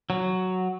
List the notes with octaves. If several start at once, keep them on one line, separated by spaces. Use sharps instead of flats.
F#3